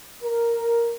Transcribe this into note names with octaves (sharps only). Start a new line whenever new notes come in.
A#4